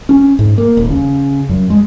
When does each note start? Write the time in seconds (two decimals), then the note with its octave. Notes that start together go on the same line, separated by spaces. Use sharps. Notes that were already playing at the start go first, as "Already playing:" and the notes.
0.09 C#4
0.39 G#2
0.58 A#3
0.77 D#1
0.90 C#3
1.49 F#2
1.70 G#3